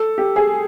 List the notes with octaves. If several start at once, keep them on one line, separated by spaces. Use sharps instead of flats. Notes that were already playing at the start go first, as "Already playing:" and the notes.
Already playing: A4
G4
G#4